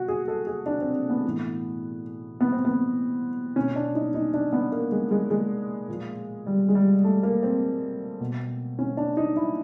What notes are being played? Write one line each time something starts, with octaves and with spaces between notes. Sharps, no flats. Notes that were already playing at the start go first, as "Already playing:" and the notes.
Already playing: B2 F#4
G#4
A4
G#4
D4
C4
B3
A2 E3
B3
C4
B3
B2 C#4
D4
D#4
D#4
D4
B3
A#3
G#3
G#3
G#3
A#2 F3
G3
G#3
G3
A3
A#3
C4
B2
C#4
D4
D#4
E4